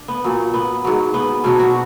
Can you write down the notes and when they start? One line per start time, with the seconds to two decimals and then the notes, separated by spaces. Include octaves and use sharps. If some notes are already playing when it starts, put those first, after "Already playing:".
Already playing: D4
0.08 B3
0.24 A#2 F#3
0.54 B3
0.84 G#2 F#3
1.14 B3
1.44 B2 F#3 D4
1.59 F#4